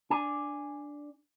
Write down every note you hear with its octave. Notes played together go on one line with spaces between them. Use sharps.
D4 G#5